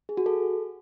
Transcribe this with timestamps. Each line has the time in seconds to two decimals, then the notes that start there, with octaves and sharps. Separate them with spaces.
0.09 G#4
0.17 F#4
0.26 A4